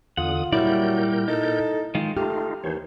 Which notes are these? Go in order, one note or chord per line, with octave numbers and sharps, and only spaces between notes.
E2 D3 F4 F#5 D#6
A#2 F#3 G3 E4 A#4 D5 G6
D#4 A4
D#3 G#3 F4
A3 D#4 F4 G4 F6
D#2 E3 C5 C#5